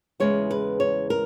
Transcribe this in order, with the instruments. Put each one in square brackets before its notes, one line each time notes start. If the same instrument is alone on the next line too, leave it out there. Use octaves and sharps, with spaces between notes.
[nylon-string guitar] E2 C#3 G#3 B3 C#5
B4
C#5
A#4